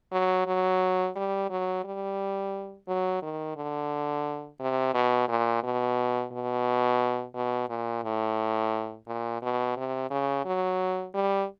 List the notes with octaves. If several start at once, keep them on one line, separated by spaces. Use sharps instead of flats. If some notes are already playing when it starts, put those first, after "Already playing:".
F#3
F#3
G3
F#3
G3
F#3
D#3
D3
C3
B2
A#2
B2
B2
B2
A#2
A2
A#2
B2
C3
C#3
F#3
G3